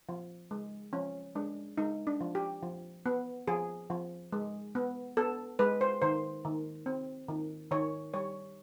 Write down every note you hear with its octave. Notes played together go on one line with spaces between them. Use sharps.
F3
G#3
F3 C#4
G#3 D4
G#3 D#4
D4
F3
G4
F3
B3
F3 G#4
F3
G#3
B3
B3 A4
G#3 B4
C5
D#3 C5
D#3
C4
D#3
D#3 C#5
G3 C#5